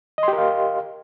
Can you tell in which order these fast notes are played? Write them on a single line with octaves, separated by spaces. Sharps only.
D#5 C6 G4 A#4 F5